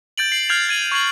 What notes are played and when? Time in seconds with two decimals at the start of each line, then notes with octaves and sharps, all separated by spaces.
0.18 G6 A6 D7 F#7
0.32 C7 F#7
0.49 F6 G6 G#6 C7 F7
0.69 G#6 D#7 F#7
0.92 C#6 G#6 C7 F#7